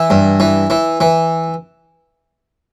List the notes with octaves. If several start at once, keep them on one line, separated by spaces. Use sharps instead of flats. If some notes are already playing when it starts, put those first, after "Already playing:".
Already playing: E3 E4
G2
E3
E3
E3